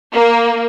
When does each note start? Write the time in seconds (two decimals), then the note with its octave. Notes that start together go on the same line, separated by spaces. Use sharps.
0.13 A#3